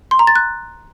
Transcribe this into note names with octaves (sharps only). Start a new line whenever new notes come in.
C6
A#5
A6
F#6